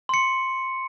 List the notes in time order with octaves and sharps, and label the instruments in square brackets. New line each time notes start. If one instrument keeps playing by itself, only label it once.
[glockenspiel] C6 C#7